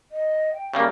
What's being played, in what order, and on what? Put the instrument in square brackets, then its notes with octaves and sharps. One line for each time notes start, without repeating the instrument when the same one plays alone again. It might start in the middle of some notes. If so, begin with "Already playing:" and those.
[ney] D#5
G5
[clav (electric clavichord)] C#3 G3 A#3